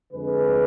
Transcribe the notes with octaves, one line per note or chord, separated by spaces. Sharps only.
F2 D3 G#3 G#4 B4